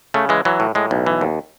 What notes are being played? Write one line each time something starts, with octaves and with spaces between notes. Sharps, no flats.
C#3 A3
E3 G#3
E3 F#3
A2
A2 G#3
B1
E3
D#2